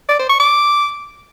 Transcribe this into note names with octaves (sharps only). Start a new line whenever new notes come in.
D5
C5
C#6
D6